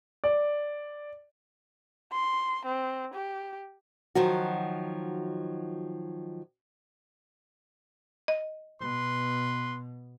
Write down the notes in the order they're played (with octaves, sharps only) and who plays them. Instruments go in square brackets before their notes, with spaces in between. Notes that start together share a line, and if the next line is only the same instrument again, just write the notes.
[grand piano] D5
[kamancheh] C6
C4
G4
[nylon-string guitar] D#3 F3 F#3 F#4
[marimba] D#5
[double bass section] B2 [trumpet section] B4 C6